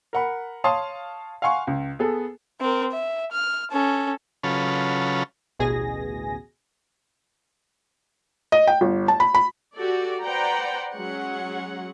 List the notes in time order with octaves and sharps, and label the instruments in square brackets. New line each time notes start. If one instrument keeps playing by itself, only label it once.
[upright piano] A#4 F#5 B5
C#5 F5 A5 C6 D#6
F5 F#5 G#5 C6 C#6
C#2
B3 G#4 A4
[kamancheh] C4 A#4
E5
F6
C#4 A4
[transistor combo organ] C#3 F#3 C#4 F4 A4 B4
[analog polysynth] A1 D2 B2 G#4 G#5 A#6
[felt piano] D#5
G5
G1
A5
B5
B5
[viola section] F#4 G4 A4 D5
B4 C5 D5 F#5 G5 A#5
F#3 G#3 C#4 C#5 F#5